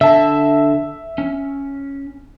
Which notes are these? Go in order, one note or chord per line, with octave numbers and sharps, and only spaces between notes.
D3 E5 A5
C#4